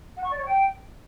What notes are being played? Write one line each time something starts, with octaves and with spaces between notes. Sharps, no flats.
F#5
C#6
D5
C#5
G5